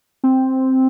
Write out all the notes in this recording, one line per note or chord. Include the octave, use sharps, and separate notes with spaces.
C4